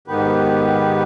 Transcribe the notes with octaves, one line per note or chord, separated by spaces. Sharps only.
G#2 D#3 B3 G4 B4